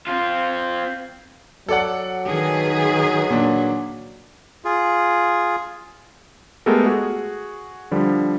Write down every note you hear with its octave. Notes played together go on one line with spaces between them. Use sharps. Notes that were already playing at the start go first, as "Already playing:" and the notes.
C4 F4
F#3 A4 D5 F#5
D#3 G#4 B4
A#2 D4
F4 G#4
G#3 A3 B3 G4 A4 A#4
F#4 G#4
D3 F3 G3